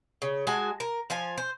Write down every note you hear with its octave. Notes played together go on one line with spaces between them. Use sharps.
C#3
G#3 F#4 G#5 A5
A#4
F3 F5 G#5
C5